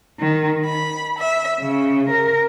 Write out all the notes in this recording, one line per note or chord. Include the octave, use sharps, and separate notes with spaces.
D#3
B5
E5
C#3
A#4